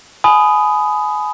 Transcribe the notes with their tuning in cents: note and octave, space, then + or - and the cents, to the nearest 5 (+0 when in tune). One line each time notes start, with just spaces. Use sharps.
G#5 +25 B5 +20 D#6 +0